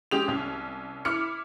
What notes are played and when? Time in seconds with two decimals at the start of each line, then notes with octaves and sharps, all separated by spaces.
0.11 G#3 C#4 G4 D#6 F7
0.28 C2 C#4
1.05 E4 D6 F6 C#7